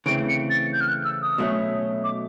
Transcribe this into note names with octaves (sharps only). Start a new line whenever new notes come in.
C#3 E3 A3 C4 D7
C#7
A6
G6
F6
F#6
E6
D#6
B2 F#3 A3 C#4
D6